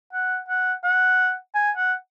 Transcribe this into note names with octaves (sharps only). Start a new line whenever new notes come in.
F#5
F#5
F#5
G#5
F#5